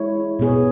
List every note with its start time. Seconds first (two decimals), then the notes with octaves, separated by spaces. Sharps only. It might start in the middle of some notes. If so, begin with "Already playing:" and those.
Already playing: G#3 E4 C#5
0.39 B2 B3 G#4 C#5